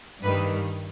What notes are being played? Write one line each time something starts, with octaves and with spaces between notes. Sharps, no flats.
G2 D#3 G3 B4